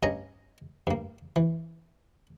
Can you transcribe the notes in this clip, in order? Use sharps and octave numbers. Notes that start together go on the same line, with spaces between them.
G2 C#4 D#5 G#5 A#5
G2 A#3
E3